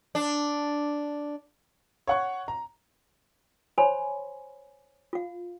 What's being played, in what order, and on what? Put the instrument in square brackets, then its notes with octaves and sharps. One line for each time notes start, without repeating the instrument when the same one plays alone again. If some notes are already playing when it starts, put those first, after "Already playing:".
[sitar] D4
[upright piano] C#5 F#5 C#6
A#5
[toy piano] C5 C#5 G#5 B5 C6
F4 F5